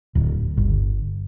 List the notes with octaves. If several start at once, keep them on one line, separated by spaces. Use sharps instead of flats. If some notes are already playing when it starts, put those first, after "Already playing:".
D1
G1